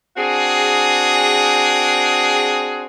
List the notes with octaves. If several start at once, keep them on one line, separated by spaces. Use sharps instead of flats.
C4 D4 F#4 G#4